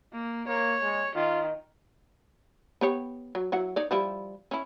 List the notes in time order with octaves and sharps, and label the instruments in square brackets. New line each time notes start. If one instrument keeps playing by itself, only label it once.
[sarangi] A#3
[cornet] A#3 [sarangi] C#5
[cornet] G#3
[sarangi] D#3 [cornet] F4
[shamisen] B3 G4 C#5
F#3
F#3 E4 F#5
D#4 C#5 D5
F3 G3 E4
C#4 E4